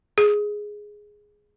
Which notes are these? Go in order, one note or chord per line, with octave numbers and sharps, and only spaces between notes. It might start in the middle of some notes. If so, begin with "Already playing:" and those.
G#4